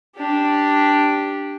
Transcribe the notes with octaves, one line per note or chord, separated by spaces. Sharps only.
D4 G4